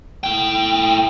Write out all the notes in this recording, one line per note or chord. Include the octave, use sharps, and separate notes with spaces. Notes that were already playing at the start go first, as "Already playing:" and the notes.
A2 G5